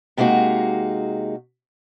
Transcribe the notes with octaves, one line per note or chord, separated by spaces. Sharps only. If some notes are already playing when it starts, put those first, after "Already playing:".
C3 G#3 A#3 D#4 F#4